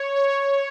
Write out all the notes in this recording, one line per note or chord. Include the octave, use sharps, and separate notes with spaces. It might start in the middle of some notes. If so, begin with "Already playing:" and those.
Already playing: C#5
C#5